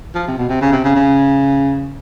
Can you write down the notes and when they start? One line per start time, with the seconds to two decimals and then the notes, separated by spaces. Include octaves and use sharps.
0.15 F3
0.28 C3
0.38 B2
0.49 C3
0.61 C#3
0.72 C3
0.84 C#3
0.95 C#3